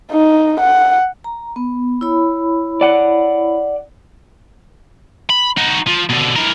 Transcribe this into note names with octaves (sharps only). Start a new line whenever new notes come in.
D#4
F#5
A#5
B3
E4 C#5 B5
D5 F#5
B5
D#4 F#4
F3
B2 D3
E3 A#4